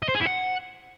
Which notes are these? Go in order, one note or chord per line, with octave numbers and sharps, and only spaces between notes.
D#5
C5
G#4
E4
F#5